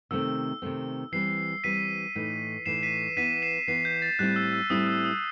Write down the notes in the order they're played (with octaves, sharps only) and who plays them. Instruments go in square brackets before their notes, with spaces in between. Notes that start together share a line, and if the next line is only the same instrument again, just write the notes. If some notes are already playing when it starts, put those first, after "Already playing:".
[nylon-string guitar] C3 D#3 A3 C4 [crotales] E6
[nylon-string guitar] C3 D#3 A3 C4
[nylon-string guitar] E3 G3 C4 [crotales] C7
[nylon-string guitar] E3 G3 C4 [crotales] B6 D#7
[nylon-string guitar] A2 E3 A3 D#4
[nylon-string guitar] A2 E3 A3 D#4 [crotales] C7 E7
[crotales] B6 D#7
[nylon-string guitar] E3 B3 E4 [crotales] B6 D#7
[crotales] C7 E7
[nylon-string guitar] E3 B3 E4 [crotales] C7
[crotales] G6
A6
[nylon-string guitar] A2 G3 C4 E4 [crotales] F#6
[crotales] E6
E6
[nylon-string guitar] A2 G3 C4 E4 [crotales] D#6
[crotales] E6
D#6